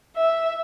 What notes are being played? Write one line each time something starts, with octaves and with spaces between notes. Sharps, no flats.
E5